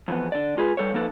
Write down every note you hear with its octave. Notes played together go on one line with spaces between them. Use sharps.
F2 E3 B3
D3 D5
G#3 F4 G#4 B4
G3 A4 B4 C#5
F3 A#3 D#4 A4 B4